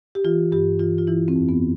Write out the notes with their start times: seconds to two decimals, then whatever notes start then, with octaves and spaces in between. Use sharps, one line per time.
0.15 G4
0.24 E3 F4
0.52 G2 G4
0.79 E3 F4
0.98 F4
1.07 E3 E4
1.28 C4
1.35 F2
1.49 B3